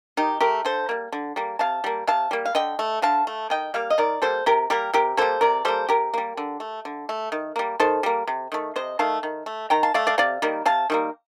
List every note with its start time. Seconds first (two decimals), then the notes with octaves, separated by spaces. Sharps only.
0.17 D#3 D#4 G4
0.40 A3 G4 A#4
0.65 D3 A4 C5
0.89 G3 A#3
1.12 D3
1.36 G3 A#3
1.59 C3 F5 A5
1.84 G3 A#3
2.07 C3 F5 A5
2.31 G3 A#3
2.46 F5
2.55 D3 D#5 G5
2.79 A3
3.02 D3 F5 A5
3.27 A3
3.50 D#3 D#5 G5
3.74 G3 A#3 F5
3.90 D#5
3.98 D#3 A#4 D5
4.22 G3 A#3 A4 C5
4.46 C3 G4 A#4
4.70 G3 A#3 G4 A#4
4.93 C3 G4 A#4
5.17 G3 A#3 A4 C5
5.41 C3 A#4 D5
5.65 G3 A#3 A4 C5
5.89 C3 G4 A#4
6.14 G3 A#3
6.37 D3
6.60 A3
6.85 D3
7.09 A3
7.32 D#3
7.56 G3 A#3
7.80 D#3 A4 C5
8.03 G3 A#3
8.27 C3
8.52 D#3 A3
8.76 C3 C5 D#5
8.99 D#3 A3 F5 A5
9.23 D#3
9.46 A3
9.70 D#3 G5 A#5
9.83 F5 A5
9.94 A3 D5 F5
10.07 D5 F5
10.18 C3 D5 F5
10.42 D#3 G3 A#3
10.65 C3 F5 A5
10.90 D#3 G3 A#3